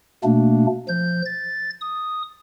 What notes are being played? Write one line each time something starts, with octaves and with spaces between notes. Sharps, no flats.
B2 A3 A#3 D4
F3 G6
A6
D#6